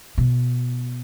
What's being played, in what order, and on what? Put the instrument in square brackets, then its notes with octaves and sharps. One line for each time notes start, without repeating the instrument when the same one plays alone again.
[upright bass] B2